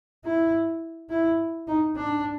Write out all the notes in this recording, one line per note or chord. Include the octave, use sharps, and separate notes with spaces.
E4
E4
D#4
D4